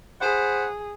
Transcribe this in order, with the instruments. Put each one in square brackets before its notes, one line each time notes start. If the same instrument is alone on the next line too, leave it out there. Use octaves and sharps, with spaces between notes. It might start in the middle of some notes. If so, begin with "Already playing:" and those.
[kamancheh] G#4 [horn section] C5 F#5 B5